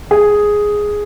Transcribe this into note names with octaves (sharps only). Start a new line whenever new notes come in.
G#4